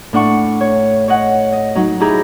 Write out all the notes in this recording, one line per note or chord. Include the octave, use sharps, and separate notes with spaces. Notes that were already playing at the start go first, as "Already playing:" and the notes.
A2 D4 F#5 C#6
C#5
C#5 D#5 F#5
D#5
F#3 D#4
D#4 E4 G4 G#4 A#5 B5